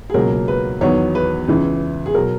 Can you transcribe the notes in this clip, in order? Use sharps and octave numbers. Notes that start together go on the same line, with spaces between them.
G#4
C#2 B2 F#3 A#3 A#4
B4
E2 D#3 F#3 B3 C#5
B4
C#2 C#3 E3
G#4
B2 F#3 A#4